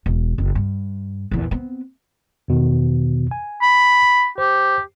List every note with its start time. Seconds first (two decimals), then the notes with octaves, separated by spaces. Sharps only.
0.06 E1
0.38 F#1 C#4
0.55 G2
1.31 A#1 E2
1.51 B3 C4
2.48 E2 B2 D#3
3.31 G#5
3.62 B5
4.38 G4 C5